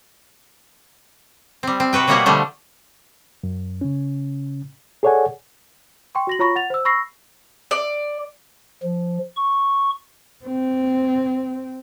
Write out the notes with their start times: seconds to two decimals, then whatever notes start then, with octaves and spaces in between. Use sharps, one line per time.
1.63 G3 C4
1.80 C4
1.93 C3 F#4 B4 G5
2.08 B2 G3 A#3 B3 C#5 F#5
2.26 D3 F3 G3 A3
3.43 F#2
3.81 C#3 C#4
5.03 G#4 A4 C#5 D5 F#5 G#5
6.15 G5 C6 C#6
6.27 F#4 A#6 F#7
6.39 F4 C#5 A#5 B5 C#6 A#6
6.56 F#5 A6 F7
6.70 C5 E6
6.85 B5 C#6 E6 A#6 C7
7.71 D5
8.83 F3
9.36 C#6
10.45 C4